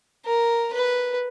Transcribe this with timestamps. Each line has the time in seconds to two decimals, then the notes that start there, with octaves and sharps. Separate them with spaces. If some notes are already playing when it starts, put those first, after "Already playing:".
0.25 A#4
0.73 B4